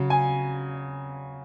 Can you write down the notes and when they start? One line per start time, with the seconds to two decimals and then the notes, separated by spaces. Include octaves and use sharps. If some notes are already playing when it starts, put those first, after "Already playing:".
Already playing: C#3 F#3
0.10 G#5